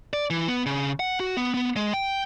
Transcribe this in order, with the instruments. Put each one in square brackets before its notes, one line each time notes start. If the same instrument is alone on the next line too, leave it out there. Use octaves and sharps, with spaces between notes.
[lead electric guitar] D5
E3
B3
C#3
F#5
F#4
B3
B3
G#3
G5